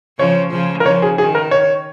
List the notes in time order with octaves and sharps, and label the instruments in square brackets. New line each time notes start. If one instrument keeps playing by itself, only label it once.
[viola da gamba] C#3 F3 [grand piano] C#5
[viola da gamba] C#3 F3
[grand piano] A#4
[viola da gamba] C#3 F3 [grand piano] C#5
[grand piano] G#4
[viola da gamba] D#3 [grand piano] G#4
[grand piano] A#4
C#5